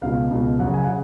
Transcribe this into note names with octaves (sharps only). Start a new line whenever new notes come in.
C#2 B2 F5
C#2 B2
F#2 C#3 F#5
G#5
C#3 F#5